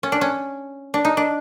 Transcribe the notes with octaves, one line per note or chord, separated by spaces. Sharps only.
C#4
D4
C#4
D4
D#4
D4